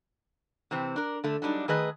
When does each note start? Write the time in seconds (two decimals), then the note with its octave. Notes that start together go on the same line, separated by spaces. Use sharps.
0.71 C3 E3 C4
0.96 D4 A#4
1.24 D3 A3
1.42 F#3 G3 D4 D#4
1.68 D#3 A3 G#4 B4 D#5